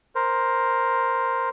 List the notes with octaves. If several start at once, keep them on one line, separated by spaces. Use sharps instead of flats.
A#4 C5